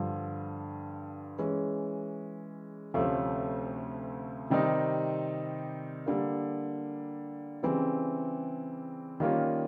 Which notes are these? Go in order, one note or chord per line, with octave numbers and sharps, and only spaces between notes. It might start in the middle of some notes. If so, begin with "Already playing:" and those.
Already playing: G2 D3 F3
E3 G#3 C#4
D2 C3 F3 A3 C#4
C3 D#3 G3 C4 D#4
D3 G3 A#3
C#3 E3 G3 C4
D#3 G3 A#3 C#4 F4